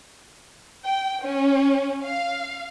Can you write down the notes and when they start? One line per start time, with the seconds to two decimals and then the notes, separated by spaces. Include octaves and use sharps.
0.83 G5
1.23 C#4
2.02 F5